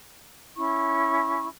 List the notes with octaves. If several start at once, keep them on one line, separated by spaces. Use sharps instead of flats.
C#4 E4 C#6